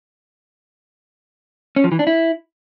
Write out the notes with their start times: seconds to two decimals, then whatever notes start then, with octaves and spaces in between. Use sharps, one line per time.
1.76 C#4
1.84 F3
1.92 E3
1.99 D4
2.07 E4